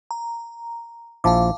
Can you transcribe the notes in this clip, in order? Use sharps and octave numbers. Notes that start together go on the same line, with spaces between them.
A#5
A#1 F3 E4 F5 A5 D6